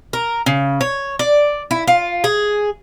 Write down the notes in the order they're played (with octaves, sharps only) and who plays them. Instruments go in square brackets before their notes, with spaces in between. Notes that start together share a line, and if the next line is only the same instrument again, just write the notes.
[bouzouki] A#4
C#3
C#5
D5
E4
F4
G#4